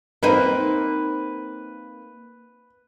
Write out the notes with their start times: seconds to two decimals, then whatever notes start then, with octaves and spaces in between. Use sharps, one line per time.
0.23 A#3 C4 D#4 B4